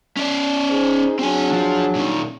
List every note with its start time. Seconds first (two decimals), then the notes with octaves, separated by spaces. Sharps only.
0.17 C#4 D5
0.69 D#4 G#4 C5
1.19 F#3 C4 D4 G#4 G#5
1.52 F3
1.95 A#2 D#3